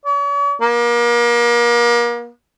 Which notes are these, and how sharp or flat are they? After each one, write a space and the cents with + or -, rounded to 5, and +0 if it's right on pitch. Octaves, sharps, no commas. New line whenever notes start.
C#5 +45
A#3 +35